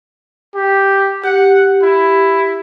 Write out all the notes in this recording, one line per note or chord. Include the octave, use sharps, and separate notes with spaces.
G4
G4 F#5
E4